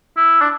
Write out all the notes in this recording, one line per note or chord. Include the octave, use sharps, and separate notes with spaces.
E4
D4